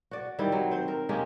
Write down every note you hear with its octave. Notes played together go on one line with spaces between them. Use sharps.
F#4 D5
D#3 G3 C4 E4
F#3
C4 C5
A#4
G#3 A#3 C#4 G4